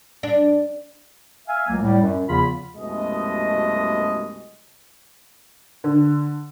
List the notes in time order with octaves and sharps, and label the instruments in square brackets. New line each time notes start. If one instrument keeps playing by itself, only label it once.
[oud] D4
[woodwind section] E5 F5 G#5
C#2 F#3 A3 A#3
A2 G3
F#2
E2 C#3 F3 F4 B5
[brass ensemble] C2 F#2 B2 G#3 A3 D#5
[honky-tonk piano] D3